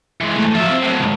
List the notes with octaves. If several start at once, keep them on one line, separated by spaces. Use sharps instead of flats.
E3 G#3
G#2 A3
F3 F#3 F4 E5
C4
A2 F#3
G#2 D#3